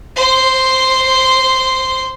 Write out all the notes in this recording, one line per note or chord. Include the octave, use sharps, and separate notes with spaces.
C5 C6